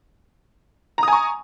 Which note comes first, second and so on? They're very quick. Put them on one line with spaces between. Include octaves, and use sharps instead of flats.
A#5 D#6 G#5 C#6